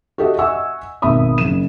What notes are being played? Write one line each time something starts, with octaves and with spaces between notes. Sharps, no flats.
F#4 G4 A4 D#5 E5
D#5 E5 F#5 G#5 C#6 E6
G#1 B2 E5 B5 D#6
F#1 E7